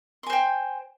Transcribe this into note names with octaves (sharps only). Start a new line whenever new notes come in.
C5 G5 G#5 C6